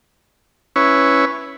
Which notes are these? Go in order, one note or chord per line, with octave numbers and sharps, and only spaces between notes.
C#4 E4 B4 C#5